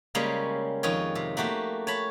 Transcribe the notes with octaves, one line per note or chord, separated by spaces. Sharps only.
C#3 G3 G#3 A#3 C#4
F2 D#3 F4 C#5
C3
A3 A#3 F#4 G4
C#5 A5 B5